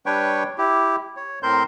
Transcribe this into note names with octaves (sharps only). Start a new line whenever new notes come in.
G3 D4 B4 C#5 G5 C#6
E4 G4
C#5
A2 C4 A#4 C5 C6 G6